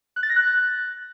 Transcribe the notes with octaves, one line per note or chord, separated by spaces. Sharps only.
F#6
A6
A#6
F#6